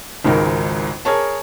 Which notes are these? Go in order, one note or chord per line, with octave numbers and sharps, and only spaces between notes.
G#1 C#2 G#2 D#3 A#4
G#4 A#4 C#5 A5